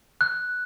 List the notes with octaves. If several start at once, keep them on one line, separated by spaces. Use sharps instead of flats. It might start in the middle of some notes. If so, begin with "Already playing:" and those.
F#6